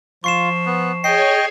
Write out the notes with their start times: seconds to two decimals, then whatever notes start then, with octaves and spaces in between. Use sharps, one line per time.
0.24 F3 F4 C#6 C7 E7
0.66 B3
1.04 G#4 C#5 D#5 G5 G#5 C7